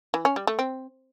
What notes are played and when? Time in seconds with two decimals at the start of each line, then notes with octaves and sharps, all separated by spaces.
0.14 E3
0.25 C#4
0.36 G3
0.47 A3
0.59 C4